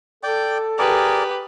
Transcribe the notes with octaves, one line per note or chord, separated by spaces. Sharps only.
A4 D5 G5 D6
G4 G#4 A#4 B4 D5